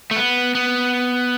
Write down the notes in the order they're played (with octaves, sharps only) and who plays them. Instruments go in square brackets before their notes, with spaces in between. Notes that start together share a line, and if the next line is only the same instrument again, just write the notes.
[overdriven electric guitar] A3
B3
B3